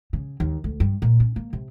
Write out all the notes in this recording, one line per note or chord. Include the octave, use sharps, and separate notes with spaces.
C#3
D#2
D2
G2
A#2
C#4
A#3
C3